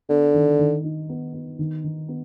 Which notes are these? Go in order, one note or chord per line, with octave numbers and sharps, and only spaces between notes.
D3 B3
D#3
D#3
D#4
B3
B3
D#3
D#3
B3